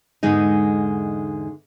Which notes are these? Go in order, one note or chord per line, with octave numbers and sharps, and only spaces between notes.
E2 G#2 D3 G#3 D#4